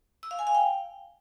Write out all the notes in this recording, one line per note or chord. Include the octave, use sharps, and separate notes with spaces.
E6
F5
G#5
F5
G5